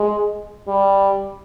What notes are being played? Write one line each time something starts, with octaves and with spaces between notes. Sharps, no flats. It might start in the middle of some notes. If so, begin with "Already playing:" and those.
Already playing: G#3
G3